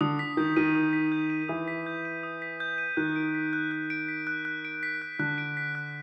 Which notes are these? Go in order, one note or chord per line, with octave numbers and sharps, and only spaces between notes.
D3 D#6
B6
D#3 G6
D#3 D#7
D#6
B6
G6
D#7
E3 D#6
B6
G6
D#7
D#6
B6
G6
D#7
D#3 F#6
D7
B6
F#6
F#6
D7
B6
F#6
F#6
D7
B6
F#6
D3 F#6
D7
B6
F#6